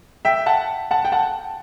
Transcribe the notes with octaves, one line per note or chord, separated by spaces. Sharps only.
E5 G5
F#5 A5
F#5 A5
G5
F#5 A5